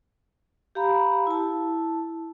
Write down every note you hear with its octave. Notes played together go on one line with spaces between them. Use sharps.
G4 F5 A#5 B5
E4 A5